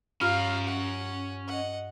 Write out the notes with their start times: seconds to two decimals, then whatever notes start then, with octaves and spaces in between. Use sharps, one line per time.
0.21 G2 C#4 F4 F5 A#5 F6
0.67 F#5
1.48 D#5 F#5